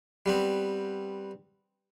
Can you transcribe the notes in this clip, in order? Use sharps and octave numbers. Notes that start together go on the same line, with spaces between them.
G3 B3 C4